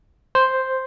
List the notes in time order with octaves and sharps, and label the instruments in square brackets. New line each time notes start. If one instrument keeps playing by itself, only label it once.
[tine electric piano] C5